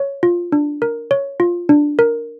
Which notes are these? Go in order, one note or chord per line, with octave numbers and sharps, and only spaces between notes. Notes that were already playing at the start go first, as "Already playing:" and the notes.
Already playing: C#5
F4
D4
A#4
C#5
F4
D4
A#4